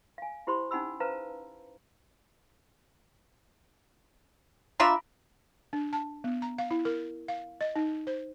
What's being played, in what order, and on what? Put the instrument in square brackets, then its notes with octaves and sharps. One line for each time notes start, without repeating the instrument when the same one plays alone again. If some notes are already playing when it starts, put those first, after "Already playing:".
[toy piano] F5 G#5
E4 G4 C5 B5 C6
C#4 D#4 F#5 G#5 B5 E6
B4 C5 F5 A5 A#5
[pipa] D4 F4 E5 [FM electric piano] A#5 B5 D6
[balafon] D4
A5
B3
A#5
F5
E4
A#4
F5
D#5
D#4
C5